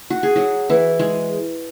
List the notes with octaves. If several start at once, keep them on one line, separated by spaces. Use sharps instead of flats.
F#4
G#4
F#3 F#4
E3 E4
G#3 G#4